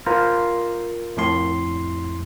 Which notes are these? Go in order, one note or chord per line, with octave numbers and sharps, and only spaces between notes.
F4 A#4 C5
F2 A2 C6